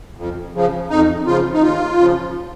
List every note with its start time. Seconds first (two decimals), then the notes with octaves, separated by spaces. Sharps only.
0.17 F2
0.54 C#3 F3
0.90 F2 D#4
1.26 C#3 F3 F4
1.53 D#4
1.62 D#2 F4
1.99 C#3 F3